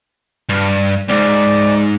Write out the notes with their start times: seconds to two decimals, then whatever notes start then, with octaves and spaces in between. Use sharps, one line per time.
0.49 G2
1.09 C#2 G#2 D5